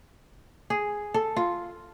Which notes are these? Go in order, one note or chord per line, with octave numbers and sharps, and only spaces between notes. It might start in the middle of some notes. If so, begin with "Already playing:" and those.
G#4
A4
F4